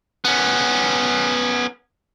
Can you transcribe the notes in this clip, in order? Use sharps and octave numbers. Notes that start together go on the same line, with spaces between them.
B3 C#4